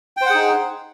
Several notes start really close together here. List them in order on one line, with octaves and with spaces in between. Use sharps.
G5 C5 F#5 G#4 D#4